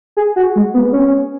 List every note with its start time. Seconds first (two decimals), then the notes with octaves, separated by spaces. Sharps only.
0.17 G#4
0.36 F#4
0.56 G#3
0.74 B3
0.93 C#4